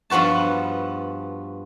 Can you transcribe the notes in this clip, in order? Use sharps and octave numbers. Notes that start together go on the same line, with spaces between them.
G2 F3 B3 F#4 A5